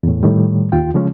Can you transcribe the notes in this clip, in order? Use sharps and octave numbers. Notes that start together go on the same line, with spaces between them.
E2 A2
A2 D#3 G3
D#2 F4 G5
C#3 F3 G#3 C#4